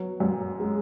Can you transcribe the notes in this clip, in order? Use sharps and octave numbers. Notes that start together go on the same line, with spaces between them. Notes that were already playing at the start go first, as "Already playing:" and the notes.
Already playing: F#3 B3
F#2
G#3